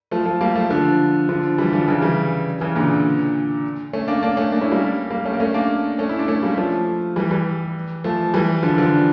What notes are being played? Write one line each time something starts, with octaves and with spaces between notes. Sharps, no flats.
F3 A3
F3 A3
G3 A#3
F3 A3
D3 F3
D3 F3
E3 G3
D3 F3
C#3 E3
E3 G3
C#3 E3
A#2 D3
A3 C#4
A#3 D4
A#3 D4
A3 C#4
A#3 D4
C#4 E4
G3 A#3
G3 A#3
A3 C#4
A#3
A3 C#4
A#3 D4
A3 C#4
E4
D4
A3 C#4
G3 A#3
F3 A3
E3 G3
E3 G3
F3 A3
E3 G3
D3 F3
D3 F3